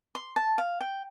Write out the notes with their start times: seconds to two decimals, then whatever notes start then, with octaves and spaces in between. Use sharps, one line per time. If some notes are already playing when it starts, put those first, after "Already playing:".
0.15 C6
0.36 A5
0.58 F5
0.81 G5